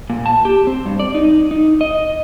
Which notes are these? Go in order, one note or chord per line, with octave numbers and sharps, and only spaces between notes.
A#2
A5
G4
C4
G2
D5
D#4
D#4
D#5